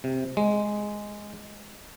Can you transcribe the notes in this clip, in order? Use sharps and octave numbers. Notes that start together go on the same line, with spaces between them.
C3
G#3